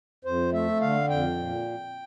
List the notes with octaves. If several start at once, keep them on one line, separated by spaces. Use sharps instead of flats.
F2 C5
A3 E5
D3 F5
F2 G5
A#2